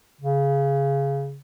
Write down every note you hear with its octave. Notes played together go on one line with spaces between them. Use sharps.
C#3